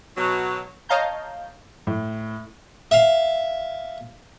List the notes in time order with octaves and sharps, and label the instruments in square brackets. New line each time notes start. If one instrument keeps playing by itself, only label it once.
[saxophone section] B2 F#3
[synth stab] C#5 D#5 F5 A5 A#5 G6
[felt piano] A2
[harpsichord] E5 F5